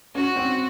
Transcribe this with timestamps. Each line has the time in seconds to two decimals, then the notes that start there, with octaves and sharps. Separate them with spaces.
0.15 C#4 F#4
0.36 C4